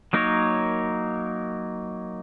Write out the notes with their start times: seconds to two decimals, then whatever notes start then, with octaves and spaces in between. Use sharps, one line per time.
0.13 F#3 A#3 D#4 A#4 C#5